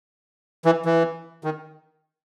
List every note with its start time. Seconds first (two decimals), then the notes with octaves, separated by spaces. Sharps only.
0.65 E3
0.85 E3
1.44 D#3